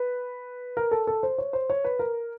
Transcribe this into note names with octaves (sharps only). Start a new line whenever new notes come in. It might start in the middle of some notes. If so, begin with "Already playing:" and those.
Already playing: B4
A#4
A4
A4
C5
C#5
C5
C#5
B4
A#4